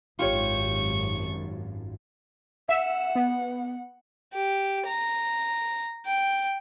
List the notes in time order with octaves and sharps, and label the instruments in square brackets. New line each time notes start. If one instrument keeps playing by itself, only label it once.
[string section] G#1 F#2 [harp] F4 G4 C#5 [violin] C#6
[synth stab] E5 E7 [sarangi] F#5
[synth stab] B3
[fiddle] G4
A#5
G5